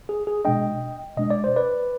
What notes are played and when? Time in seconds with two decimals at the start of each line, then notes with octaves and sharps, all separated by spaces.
0.09 G#4
0.27 G#4
0.45 B2 G#3 D4 D#5 G5
1.17 B2 G#3 D4 D#5
1.30 D5
1.44 C5
1.56 B4 D5